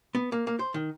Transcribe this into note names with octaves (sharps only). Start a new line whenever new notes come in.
B3
A#3
A#3
C5
D#3